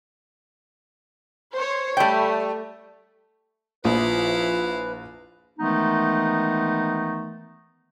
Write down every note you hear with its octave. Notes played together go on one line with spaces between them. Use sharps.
C5 C#5
G3 A3 G5
A#1 F3 E4 B4 F5
D#3 E3 G#3 A3 B3 D#4